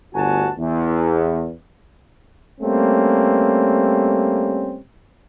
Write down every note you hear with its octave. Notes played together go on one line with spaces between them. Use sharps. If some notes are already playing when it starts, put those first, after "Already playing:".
G1 D2 F#4 G#5 A5
E2
G3 A3 A#3 C4 C#4